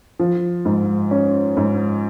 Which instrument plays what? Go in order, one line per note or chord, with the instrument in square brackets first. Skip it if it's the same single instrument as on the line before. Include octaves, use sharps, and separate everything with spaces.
[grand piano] F3
G#2
C#4
G#2